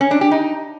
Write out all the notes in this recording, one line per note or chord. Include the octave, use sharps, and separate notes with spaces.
C#4
D4
G4
D#4